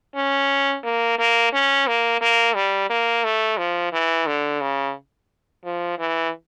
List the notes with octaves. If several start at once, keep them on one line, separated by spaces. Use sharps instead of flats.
C#4
A#3
A#3
C#4
A#3
A#3
G3
A#3
A3
F3
E3
D3
C#3
F3
E3